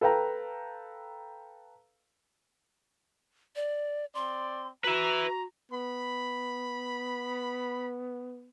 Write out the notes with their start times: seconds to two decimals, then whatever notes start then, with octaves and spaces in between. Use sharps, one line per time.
0.01 A4 B4 F5 G5 A#5
3.56 D5
4.15 C4 D5 C6
4.84 F#4 B4 E5 A#5
5.72 B3 B5